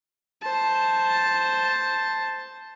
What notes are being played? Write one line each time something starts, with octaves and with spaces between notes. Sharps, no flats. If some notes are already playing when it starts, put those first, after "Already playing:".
C5 A5